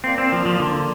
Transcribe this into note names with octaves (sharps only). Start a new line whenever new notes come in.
A#3 C4 F4 D5
C4
F3
F3
D3